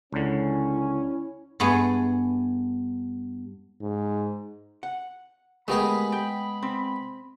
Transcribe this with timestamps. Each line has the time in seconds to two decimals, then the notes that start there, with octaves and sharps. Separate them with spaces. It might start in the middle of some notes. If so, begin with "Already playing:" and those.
0.13 C#2 D3 C#4 E4
1.60 G2 A3 B3 G#4
3.81 G#2
4.83 F#5
5.68 G#3 A3 B3 G4 G#4 A#4 B5
6.12 G5
6.63 C4